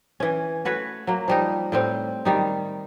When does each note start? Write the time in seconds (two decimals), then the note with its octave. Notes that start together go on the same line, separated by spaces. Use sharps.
0.20 E3 C#4
0.65 A3 F#4 B4 C#5
1.07 F#3 A#3
1.28 F3 G3 D#4
1.72 A2 G3 C4
2.25 D#3 G3 D#4